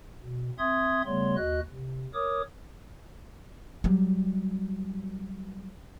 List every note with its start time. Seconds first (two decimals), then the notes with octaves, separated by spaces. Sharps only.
0.22 B2
0.59 C4 E5 C6 D#6 G#6
1.06 C#3 G3 A3 B3 C#5 C6
1.37 D#2 F#4 D#5 F#6
1.71 C3
2.14 A#4 C#5 D6 D#6
3.84 F#3 G3